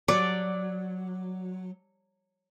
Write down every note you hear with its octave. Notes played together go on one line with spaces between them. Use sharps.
F#3 D5